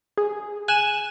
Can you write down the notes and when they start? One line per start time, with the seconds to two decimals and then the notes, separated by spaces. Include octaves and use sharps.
0.17 G#4
0.68 G#5 F#6 E7